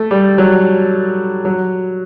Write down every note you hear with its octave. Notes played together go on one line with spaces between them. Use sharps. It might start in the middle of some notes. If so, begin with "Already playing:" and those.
Already playing: A3
G3
F#3
F#3